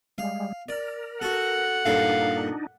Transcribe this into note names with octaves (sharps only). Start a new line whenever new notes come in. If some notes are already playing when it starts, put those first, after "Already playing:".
G3 G#3 F5
A#4 D5
F#4 A4 F#5
G2 A#2 D4 D#4 A4 F5